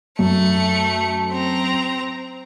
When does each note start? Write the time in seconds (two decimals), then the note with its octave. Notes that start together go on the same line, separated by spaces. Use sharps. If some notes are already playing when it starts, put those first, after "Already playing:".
0.19 F#2 A3 C#7
1.30 C4 A#5